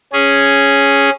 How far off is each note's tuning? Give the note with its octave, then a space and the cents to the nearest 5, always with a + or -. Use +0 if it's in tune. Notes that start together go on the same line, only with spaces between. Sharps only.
C#4 +0 G#4 +0